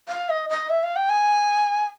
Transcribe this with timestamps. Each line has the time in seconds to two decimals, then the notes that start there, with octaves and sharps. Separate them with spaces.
0.09 F5
0.29 D#5
0.50 D#5
0.70 E5
0.83 F5
0.96 G5
1.10 G#5